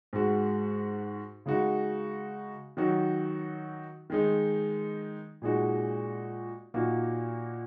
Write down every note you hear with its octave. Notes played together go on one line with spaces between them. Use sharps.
G#2 G#3 F#4
C#3 G#3 D#4 F#4
D#3 F#3 D#4 F#4
D#3 G#3 D#4
A#2 G#3 D#4 F#4
A#2 A#3 D#4 F#4